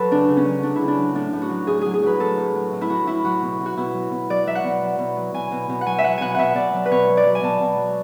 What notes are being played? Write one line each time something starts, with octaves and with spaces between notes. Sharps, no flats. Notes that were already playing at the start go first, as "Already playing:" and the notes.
Already playing: F#3 A4 B4
C#3 D4
C#3
C#4
F#3
F#3 D4
E4
C#3
D4
F#3
A2 D4
A2
F#4
F#3
A2 G#4
F#3 G#4
G#4
F#3 B4
A2 A4
A2
F#3
A2
E4
F#3 F#4
A2 E4
F#3 F#4
B2
B2
F#4
B2 E4
F#3
B2
F#3 D5
F#3 E5
F#5
B2
F#3
B2
F#3
B2 G#5
B2
B2
F#5
F#3 G#5
E5
F#3 F#5
B2 F#5 G#5
B2 E5 F#5
B2 D5
F#3
B4
B2 C#5
F#3
D5
F#3
G#5
B2 A5
B2
F#3